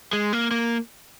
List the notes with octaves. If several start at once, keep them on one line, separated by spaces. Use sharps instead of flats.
G#3
A#3
A#3